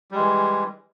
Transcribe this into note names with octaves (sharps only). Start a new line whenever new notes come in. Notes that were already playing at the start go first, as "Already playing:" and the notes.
E3 G3 G#3